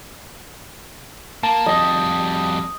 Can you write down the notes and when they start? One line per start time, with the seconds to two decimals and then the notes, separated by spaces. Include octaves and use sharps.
1.43 A#3 A5
1.66 F2 G3 D#5